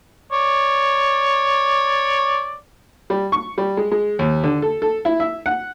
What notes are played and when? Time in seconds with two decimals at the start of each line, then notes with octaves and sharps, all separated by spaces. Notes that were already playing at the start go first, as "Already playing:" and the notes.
0.32 C#5 D5
3.10 G3
3.32 C#6
3.58 G3
3.77 G#3
3.91 G#3
4.19 D#2
4.44 D3
4.62 A4
4.82 A4
5.05 E4
5.20 E5
5.46 F#5